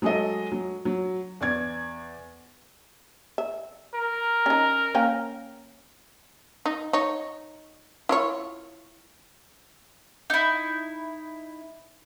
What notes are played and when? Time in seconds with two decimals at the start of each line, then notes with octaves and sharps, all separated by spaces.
0.02 F#3 G#3 G#4 A4 D#5
0.52 F#3
0.85 F#3
1.40 E2 D5 G#6
3.38 E5
3.95 A#4
4.46 C#4 D#4
4.95 A#3 C#4 G5
6.66 D#4
6.93 D#4 C#5
8.09 E4 F4 C#5
10.30 D#4 E4